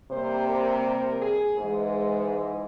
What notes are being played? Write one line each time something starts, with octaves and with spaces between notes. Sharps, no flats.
C3 G3 A#3 C5
A#4
G#4
G#2 E3 G#3
G#4